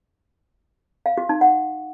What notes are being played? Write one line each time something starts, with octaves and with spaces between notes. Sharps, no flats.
F5
F#4
D#4
F#5